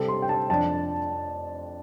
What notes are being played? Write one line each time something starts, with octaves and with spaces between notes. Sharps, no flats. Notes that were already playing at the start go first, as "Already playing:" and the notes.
Already playing: C3 G3 C4 A4
C6
G5
A5
F2 F3 D4 A5